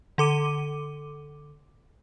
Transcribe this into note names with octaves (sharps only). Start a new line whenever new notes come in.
D3 A4 D6 D#7